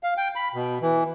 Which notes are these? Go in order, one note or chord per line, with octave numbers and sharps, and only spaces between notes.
F5
G5
B5
B2
E3